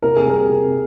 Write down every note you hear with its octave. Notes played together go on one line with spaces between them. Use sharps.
C3 A#4
G#4
G3 A#4
C3